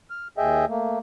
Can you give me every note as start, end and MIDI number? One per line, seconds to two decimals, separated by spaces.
0.10 0.28 89
0.38 0.65 39
0.38 0.65 68
0.38 0.65 75
0.38 0.65 76
0.38 0.65 79
0.69 0.99 57
0.69 0.99 58